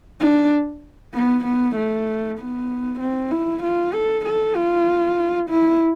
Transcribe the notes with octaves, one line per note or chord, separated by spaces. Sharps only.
D4
B3
B3
A3
B3
C4
E4
F4
A4
A4
F4
E4